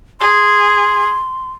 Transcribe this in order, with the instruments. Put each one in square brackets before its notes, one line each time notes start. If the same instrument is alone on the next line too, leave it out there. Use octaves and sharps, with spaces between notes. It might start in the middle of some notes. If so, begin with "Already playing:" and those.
[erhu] G#4 [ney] C6